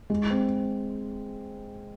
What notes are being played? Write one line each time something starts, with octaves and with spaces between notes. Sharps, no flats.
G#3
C4